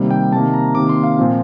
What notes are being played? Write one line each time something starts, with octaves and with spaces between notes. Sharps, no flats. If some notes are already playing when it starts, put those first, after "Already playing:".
Already playing: C3 D#3 G3 A#3
G5
C3 D#3 A#3 A5
A#5
C3 D#3 A#3 D6
C6
F5
A#2 F3 C4